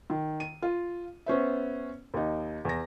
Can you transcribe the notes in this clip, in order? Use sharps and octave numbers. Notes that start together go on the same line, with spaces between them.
D#3
D#7
F4
B3 C#4 C5 E5
D#2 D#4
E2 A#6